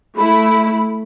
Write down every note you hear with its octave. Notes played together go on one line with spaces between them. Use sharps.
A3 E4 B5